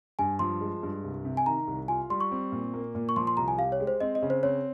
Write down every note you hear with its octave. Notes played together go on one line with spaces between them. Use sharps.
G2 G#5
F3 C6
G#3
G2
C2
C3
G#5
D#3 A#5
C2
F4 G#5
G3 C6
C#6
C4
A#2
A#3
A#2
C#6
F3 C6
C6
C2 A#5
G#5
G4 F5
C#5
G#3
C5
C4 D#5
D#5
C#3
C5
C4 C#5